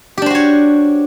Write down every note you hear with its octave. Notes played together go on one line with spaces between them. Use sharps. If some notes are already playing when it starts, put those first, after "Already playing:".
D4 F#4 G4 C5 C#5